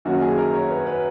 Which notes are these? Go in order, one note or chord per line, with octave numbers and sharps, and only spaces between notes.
F#2 D#3 A#3 C#4 F#4
G#4
A#4
C#5
B4
B4